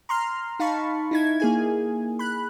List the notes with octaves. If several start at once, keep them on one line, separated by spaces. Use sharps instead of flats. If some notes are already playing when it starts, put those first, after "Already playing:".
A#5 C6 F6
D#4 F5 A5 B5 C#6
D#4 E4 G#6
A#3 G#4 G#5
B5 F#6